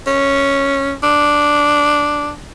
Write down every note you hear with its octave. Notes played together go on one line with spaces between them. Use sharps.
C#4
D4